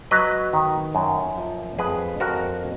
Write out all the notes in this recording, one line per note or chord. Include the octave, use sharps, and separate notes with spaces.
F#3 B4 D#5
D#3
F#2
F3
F2 G#4 B4
F2 F#4 A#4